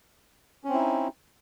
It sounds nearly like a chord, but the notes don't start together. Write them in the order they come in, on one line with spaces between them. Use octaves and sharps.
C#4 C4 E4 D#4